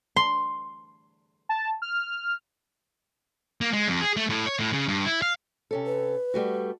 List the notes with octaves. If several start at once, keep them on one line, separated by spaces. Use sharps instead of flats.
C6
A5
F6
A#3
G#3
F2
G#4
A3
A2
C#5
A2
C#3
G2
E4
F5
C3 C#4 A4
B4
G3 A3 F#4